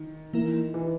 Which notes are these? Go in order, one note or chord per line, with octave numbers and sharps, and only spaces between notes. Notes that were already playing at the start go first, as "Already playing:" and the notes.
Already playing: D#3
E3 A#3 E4 A#4
E3